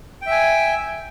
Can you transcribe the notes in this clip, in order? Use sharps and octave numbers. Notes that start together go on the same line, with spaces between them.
E5 G5 G#5